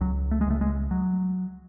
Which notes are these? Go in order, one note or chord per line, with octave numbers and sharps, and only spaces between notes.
C#2 F#3
A3
G#3
C#2 A3
G#3
F#3